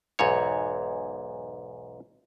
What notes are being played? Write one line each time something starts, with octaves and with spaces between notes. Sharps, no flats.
B1 E2 G#2 C#5